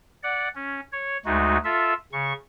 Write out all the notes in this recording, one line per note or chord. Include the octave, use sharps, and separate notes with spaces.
D5 F#5
C#4
C#5
D2 G#3 A3 D#4 F#4
F4 A4 E5
C#3 C#6